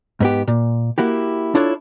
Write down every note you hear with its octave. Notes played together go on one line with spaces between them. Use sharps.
G#2 B3 G4
A#2
A#3 E4 F#4 G4
D4 E4 F4 A4 C#5